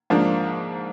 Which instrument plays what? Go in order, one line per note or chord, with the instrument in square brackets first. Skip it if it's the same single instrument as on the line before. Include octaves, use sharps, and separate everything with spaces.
[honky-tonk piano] G#2 F3 A#3 D4